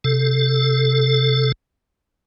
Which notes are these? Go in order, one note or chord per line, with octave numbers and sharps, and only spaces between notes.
C3 A4